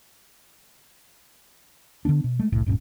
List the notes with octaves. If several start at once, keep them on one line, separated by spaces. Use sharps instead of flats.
D3 F3 B3 D4
B2
G#3 A3
F1 C2 A2
D1 G2 A#2 C#4